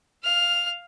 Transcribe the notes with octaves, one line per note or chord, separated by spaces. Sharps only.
F5 F6